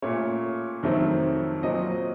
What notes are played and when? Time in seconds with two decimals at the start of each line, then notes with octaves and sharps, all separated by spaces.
0.02 A#2 A3 C#4 C#5
0.83 F2 D#3 F#3 A3 C4
1.63 A#2 F#3 C4 D#5